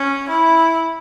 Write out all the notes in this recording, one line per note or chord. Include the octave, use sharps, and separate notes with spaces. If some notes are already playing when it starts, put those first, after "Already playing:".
Already playing: C#4
E4